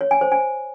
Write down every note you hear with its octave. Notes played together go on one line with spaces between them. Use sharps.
C#5
G#5
C5
G#5